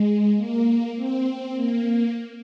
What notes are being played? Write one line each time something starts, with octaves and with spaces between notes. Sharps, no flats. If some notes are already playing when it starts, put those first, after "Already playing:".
Already playing: G#3
A#3
C4
A#3